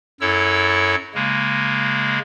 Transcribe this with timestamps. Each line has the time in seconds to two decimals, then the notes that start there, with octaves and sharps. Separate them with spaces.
0.21 F#2 E4 A4 C#5 E6
1.14 C#3 G#3 A#3